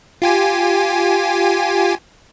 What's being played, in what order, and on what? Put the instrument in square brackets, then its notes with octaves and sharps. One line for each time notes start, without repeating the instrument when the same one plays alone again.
[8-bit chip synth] F4 G4 G#5